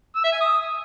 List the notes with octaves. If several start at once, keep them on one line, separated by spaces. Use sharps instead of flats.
E6
E5
G#5
D#6